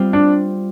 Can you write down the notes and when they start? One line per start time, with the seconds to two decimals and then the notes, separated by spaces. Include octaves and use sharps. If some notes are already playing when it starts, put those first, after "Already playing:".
Already playing: G3 C4 F4
0.13 D4